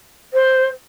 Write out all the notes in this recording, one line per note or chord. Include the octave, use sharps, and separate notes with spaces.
C5